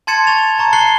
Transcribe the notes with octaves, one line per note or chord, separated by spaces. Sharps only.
A5 C6 G#6 A6 C#7 E7
C#6 A6 F7
A5 A#5 C#6 G#6
F#6 A6 C7 C#7 F#7 G7